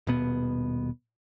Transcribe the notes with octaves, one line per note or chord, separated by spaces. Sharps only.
D#1 B2 B3